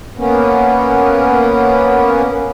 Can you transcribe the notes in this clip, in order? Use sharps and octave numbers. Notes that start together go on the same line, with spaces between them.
A#3 B3 C#4